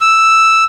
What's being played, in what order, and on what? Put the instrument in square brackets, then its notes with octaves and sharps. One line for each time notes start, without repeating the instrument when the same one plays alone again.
[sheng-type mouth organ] E6